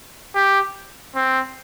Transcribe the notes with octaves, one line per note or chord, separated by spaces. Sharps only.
G4
C4